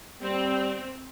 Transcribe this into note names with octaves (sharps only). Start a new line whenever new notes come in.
G3 C4